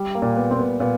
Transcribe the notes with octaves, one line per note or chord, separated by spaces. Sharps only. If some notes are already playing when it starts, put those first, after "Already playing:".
Already playing: G3
A#3
A#2
B3
A#2 C4
B3
A#2 B3